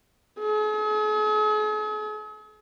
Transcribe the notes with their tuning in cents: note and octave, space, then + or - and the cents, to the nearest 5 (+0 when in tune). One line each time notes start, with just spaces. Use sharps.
G#4 +45